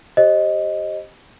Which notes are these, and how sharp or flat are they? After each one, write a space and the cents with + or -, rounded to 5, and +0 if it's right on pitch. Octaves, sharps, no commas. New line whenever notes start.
G4 +0 C5 +30 D#5 +0